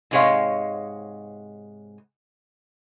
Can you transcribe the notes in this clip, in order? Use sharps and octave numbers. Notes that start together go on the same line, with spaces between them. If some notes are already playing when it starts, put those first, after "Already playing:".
G#2 C3 G#3 C#5 D#5 F5